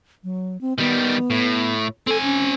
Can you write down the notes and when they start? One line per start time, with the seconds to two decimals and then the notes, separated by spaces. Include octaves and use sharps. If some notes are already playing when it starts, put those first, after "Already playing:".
0.24 F#3
0.61 C4
0.78 D#3 G3 B3
1.30 A2
2.07 C4 A4 G#5
2.23 C#4